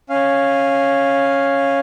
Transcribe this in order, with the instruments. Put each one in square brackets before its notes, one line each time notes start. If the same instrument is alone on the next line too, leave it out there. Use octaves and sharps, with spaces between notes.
[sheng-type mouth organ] C#4 F5